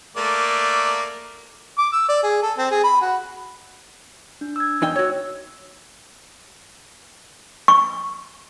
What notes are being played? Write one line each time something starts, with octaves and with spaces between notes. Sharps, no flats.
A3 A#3 D5
D6
E6
D5
G#4
A4
C4
G#4
B5
F#4
D4
E6 G#6
E2 D#4 G5
F#4 C#5 E6
C#6